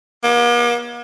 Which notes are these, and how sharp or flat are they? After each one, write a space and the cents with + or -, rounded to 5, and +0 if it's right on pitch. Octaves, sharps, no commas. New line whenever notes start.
A#3 +45